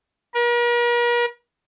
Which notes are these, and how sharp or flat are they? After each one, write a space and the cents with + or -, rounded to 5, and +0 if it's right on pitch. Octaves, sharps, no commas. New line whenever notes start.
A#4 +45